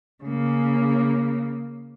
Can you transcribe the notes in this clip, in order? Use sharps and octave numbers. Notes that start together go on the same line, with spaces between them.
C#3 A#3